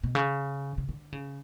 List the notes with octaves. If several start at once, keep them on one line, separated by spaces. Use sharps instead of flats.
B2
C#3
C#3
D3
C#3